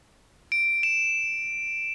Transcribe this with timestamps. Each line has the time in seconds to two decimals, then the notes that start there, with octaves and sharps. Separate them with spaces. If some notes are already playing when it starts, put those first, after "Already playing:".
0.52 D7
0.83 E7